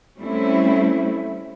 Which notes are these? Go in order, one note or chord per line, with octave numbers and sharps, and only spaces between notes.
G3 A3 C4 C#4 E4